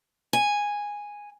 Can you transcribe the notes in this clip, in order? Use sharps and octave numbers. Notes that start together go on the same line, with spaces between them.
G#5